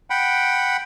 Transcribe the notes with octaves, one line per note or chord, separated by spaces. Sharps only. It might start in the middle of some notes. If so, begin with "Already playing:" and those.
F#5 G5 B5